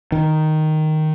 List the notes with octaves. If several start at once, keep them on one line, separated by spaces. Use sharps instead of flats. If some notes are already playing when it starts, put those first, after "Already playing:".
D#3